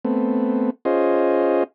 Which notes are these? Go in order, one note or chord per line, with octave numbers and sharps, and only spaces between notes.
A3 B3 C4
C#4 F4 G#4 C5 D#5